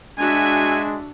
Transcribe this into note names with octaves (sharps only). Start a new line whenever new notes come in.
G#3 D4 F#4 E5 G#5